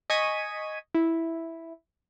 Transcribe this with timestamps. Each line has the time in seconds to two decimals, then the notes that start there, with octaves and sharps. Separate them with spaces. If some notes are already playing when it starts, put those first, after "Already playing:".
0.10 D#5 G#5 C#6 G#6 B6 D#7
0.95 E4